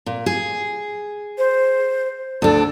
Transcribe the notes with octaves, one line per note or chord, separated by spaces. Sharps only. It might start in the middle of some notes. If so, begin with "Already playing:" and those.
A#2
G#4
C5
D2 D4 A4